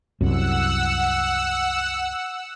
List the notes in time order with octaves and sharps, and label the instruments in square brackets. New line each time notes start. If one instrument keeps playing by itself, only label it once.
[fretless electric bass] C2 F#2 [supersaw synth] F#5 E6